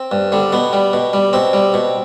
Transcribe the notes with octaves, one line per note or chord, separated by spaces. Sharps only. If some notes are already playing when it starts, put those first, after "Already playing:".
Already playing: C4
G2
D3 G3
B2 B3
G3
B2
G3
B2 C4
G3
B2